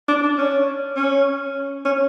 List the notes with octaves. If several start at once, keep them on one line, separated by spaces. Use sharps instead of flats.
D4
D4
C#4
C#4
C#4